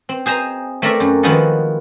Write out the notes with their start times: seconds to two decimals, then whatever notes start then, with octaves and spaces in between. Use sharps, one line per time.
0.09 C4
0.26 G#4 C5 D#5 A#5
0.82 A3 C4 A4 A#4 D5 E5
1.00 F#2
1.23 D#3 F3 G#3 B3 F#4 A4